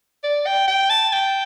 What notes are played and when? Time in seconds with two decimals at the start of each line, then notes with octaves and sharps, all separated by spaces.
0.23 D5
0.46 G5
0.68 G5
0.90 A5
1.13 G5